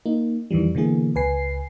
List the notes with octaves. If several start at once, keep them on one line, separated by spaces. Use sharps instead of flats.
A#3 D#4
F2 D#3 E3 G3
B2 D3 E3 A#3 G#4
C#2 B4 G#5 C7